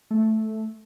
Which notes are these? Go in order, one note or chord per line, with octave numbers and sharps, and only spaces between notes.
A3